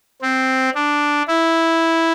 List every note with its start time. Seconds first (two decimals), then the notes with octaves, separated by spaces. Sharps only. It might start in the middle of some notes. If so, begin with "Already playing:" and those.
0.22 C4
0.75 D4
1.28 E4